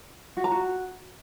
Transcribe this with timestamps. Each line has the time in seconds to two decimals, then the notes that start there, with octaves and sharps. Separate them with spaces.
0.37 F#4
0.44 A#5
0.52 F#4